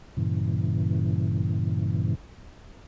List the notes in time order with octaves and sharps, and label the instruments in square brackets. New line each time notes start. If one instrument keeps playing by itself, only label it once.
[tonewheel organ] G2 A#2 C#3 E3